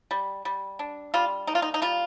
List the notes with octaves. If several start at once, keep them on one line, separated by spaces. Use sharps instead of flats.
G3
G3
D4
G3 F4
A#3 D#4
F4
D#4
D#4
G3 F4